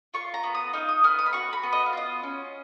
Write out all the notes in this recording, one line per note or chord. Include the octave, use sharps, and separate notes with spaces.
F4 C#6
A#5
B3
D#6
D#4 F5
D#6
B3 F6
D#6
B5
F#4 C#6
B5
B3
D#5
F5
F4 D#5
C#4